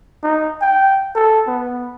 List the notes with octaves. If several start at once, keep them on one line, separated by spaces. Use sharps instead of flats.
D#4
G5
A4
B3